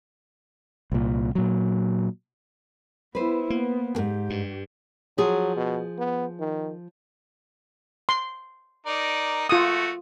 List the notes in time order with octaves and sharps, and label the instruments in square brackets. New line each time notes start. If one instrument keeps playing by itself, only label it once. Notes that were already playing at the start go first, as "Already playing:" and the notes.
[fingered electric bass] C2 A#2
A#2 F#3
[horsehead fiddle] B3 E4 [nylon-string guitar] B4 C5
[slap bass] A#3 [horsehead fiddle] B3
[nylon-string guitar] D#2 G#2 [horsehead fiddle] G4
[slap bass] G2
[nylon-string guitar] F3 G#4 [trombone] F#3
[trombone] B2
B3
D#3
[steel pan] C6
[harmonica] D#4 A#4 D5
[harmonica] A3 F#4 [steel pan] F4 D#6